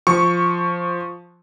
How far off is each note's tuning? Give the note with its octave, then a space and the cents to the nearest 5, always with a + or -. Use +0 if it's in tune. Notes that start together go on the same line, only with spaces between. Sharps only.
F3 +0 C#6 +0